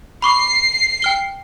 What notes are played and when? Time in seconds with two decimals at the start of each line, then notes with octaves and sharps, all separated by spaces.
0.22 B5 C#6 D6 C7
1.02 G5 F6 G7